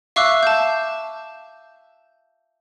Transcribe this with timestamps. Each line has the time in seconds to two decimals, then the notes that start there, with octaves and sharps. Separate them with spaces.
0.16 E5 F5 C#6 D6 E6 F#6
0.43 A5 G6